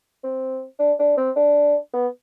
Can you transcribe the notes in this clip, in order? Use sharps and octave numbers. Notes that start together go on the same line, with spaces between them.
C4
D4
D4
C4
D4
B3